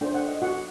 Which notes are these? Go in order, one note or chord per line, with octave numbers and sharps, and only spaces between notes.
D4 A4 C5 G5
F#5
D#5
F#4 F#5